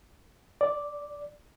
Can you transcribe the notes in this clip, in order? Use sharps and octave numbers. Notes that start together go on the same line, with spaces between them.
D5